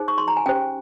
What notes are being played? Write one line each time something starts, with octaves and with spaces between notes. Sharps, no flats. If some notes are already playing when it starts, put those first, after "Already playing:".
Already playing: D#4 G#4 C5
C#6
C6
A#5
G#5
C#4 G4 C5 G5